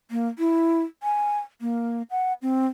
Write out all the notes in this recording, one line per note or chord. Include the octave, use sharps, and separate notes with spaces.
A#3
E4
G#5
A#3
F#5
C4